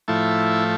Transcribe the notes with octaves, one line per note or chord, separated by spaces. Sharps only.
A2 F3 A3 E4